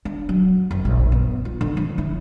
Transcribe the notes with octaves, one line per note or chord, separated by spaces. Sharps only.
D4
F#3
F#1
A#1
B3
F4
D3
F3
E4